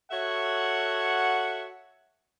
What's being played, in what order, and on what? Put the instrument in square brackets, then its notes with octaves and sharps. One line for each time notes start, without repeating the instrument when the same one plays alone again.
[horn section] F#4 A4 C#5 E5 F#5